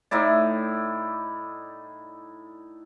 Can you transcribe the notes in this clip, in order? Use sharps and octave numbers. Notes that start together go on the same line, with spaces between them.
A2 D#4 E4 D5